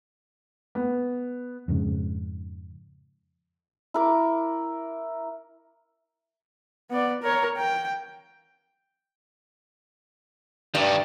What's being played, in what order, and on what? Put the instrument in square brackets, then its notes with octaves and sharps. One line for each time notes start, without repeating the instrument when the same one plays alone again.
[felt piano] B3
[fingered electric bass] F2 G#2 C#3
[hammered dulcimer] E4 A#4 D6
[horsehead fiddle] B3 D5
A#4 C#5
G5
[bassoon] G2 [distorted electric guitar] D#3 A3 [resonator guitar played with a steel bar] D5